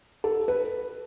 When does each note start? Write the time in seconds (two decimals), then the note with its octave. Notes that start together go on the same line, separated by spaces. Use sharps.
0.24 A4
0.48 B4